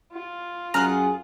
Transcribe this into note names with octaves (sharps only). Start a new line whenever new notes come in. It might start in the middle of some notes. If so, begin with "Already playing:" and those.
F4
F#2 G#4 F#5 A#5 F6